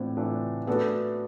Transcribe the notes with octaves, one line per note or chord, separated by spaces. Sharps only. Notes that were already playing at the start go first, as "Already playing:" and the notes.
Already playing: A2 E3 A3 C4 D4 F4
A2 E3 A3 D4 F4
A3 B3 D4 F#4 A4